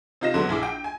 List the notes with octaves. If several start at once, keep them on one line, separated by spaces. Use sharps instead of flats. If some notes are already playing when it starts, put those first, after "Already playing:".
C3 D#4 F4 D#5 A#6 E7
D3 F#3 G#3 B3
A#1 E4 G#4 D6
G5
G#5